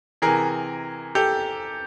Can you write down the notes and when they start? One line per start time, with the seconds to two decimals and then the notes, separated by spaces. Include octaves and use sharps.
0.22 C3 E3 G#4 A#4
1.15 G4 A4